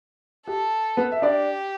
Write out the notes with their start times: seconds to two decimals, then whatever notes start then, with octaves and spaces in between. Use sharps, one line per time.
0.47 G4 A4
0.97 B3 B4
1.12 E5
1.22 D4 G4 D5